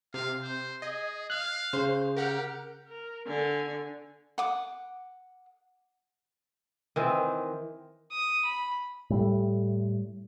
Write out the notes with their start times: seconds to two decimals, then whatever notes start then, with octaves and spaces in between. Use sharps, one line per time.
0.14 C3 F5
0.42 C5
0.82 G#4 D#5
1.30 F5 F#6
1.73 C#3 C5
2.17 G4 A#4 F#5 F6
2.88 A#4
3.27 D3 G#5
4.38 F#5 D6
6.96 D#3 E3 C4
8.12 D#6
8.45 B5
9.10 A2 G3 A3